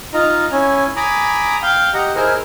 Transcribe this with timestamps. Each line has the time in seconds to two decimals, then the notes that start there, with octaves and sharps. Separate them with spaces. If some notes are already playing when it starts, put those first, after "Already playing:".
0.14 D#4 F4 D#5 A#5
0.52 C#4 E4 G#5
0.96 G#5 A#5 B5 D6 D#6
1.63 F5 G5
1.94 G4 D#5 F#5 A#5
2.16 E4 G#4 A#4 C5 D#5 F6